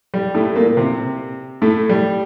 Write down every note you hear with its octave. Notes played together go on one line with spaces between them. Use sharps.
G3
A2 A3
A#2 A#3
A#3
C3 C4
A2 A3
G3